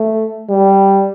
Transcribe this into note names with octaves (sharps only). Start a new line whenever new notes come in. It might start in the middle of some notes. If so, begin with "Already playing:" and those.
Already playing: A3
G3